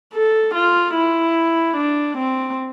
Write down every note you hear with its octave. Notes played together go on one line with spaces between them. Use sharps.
A4
F4
E4
D4
C4